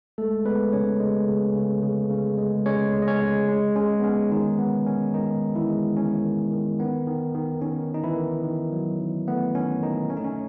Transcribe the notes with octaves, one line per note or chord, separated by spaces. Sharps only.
G#3 A3 A4
G#3 B3 B4
C#3 C#4 C#5
G#3
C#3
C#3
C#3
C#3
G#3
G#3 C#4 C#5
G#3
D#5
C#4 C#5
G#3
G#3
G#3 C#4
B3
G#3 C#4
D#3 G#3 D#4
G#3 B3
D#3 C#4
D#3 G#3 D#4
D#3
E3 E4
G#3
D#3 C#4
D#3
D#3
D#3 B3
D#3
D#3
D#3 C#4
D#3 D#4
E3 E4
D#3
D#3
F#3
D#3
A3 B3
D#3 C#4
D#3 A3 D#4
A3 C#4
D#4
C#4